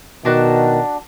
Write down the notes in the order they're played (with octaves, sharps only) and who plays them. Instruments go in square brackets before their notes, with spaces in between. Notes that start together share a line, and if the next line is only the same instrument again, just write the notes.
[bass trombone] B2 [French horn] D#3 [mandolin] D4 F#4 F#6